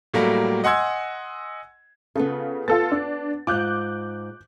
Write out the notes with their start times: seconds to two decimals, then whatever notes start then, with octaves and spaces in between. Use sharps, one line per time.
0.14 A2 F#3 G3 A3 A#3
0.64 D#5 F#5 G#5 C6 E6 G#6
2.16 C#3 B3 F4 A4
2.68 B3 F4 A4 A6
2.92 D4
3.47 G#2 F4 D6 F#6 G6